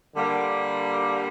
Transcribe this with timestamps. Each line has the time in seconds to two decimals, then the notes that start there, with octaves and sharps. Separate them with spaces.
0.15 D3 G3 A#3